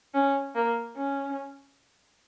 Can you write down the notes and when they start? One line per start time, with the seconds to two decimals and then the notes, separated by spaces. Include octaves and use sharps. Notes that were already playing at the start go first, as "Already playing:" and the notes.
0.14 C#4
0.55 A#3
0.96 C#4